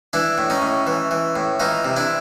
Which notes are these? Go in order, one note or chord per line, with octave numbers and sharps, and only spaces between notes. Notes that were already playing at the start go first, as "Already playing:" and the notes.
E3 D4 E4
A2
C#4 D#4
A2
E3
E3
A2
E3 D#4 F4
C3
D4 E4